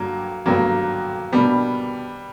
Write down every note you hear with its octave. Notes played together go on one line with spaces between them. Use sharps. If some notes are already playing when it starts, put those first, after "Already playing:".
Already playing: G2 D3 F#3 G3 A#3
G2 D3 F#3 G3 A#3 B3
B2 G3 A#3 B3 D4 G4